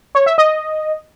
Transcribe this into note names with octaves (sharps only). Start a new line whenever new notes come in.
C#5
E5
D#5